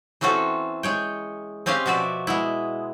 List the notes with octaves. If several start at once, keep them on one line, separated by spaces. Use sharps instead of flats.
E3 C4 C#4 F#4 A4
G#3 C#5 G5
C4 C#4 G4 D#5 F5
B2 F3 F#4 D5 E5
G#3 B3 E4